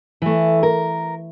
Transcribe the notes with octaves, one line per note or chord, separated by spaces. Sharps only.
E3 A3
A#4